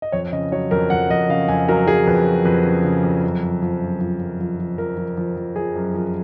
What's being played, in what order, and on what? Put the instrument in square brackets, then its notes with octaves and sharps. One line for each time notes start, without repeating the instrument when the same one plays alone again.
[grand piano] D#5
F2 C#5
C#3 D#5
F#3 C#5
F2 A#4
F2 F#5
F2 D#5
C#3 F5
F2 G#5
F#3 A#4
F#3 G#4
F2 B4
F#3
F2 B4
C#3
C#3
F2
F#2
F3
F3
F#2
F3
F#2
F3
F3
F3 A#4
F3
F3
F3
F3 G#4
F#2
F3